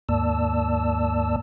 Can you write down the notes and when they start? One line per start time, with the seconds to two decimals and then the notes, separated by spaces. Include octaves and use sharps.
0.09 D#2 G#2 A#3 D5 A5 E6